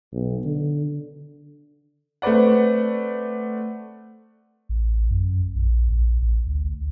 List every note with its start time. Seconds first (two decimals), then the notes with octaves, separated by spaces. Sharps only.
0.13 B1
0.45 D3
2.22 A3 C4 B4 D5 F#5
4.69 A1
5.11 F#2
5.55 A#1
5.90 A#1
6.22 A1
6.47 D2